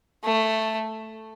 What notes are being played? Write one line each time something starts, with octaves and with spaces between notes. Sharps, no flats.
A3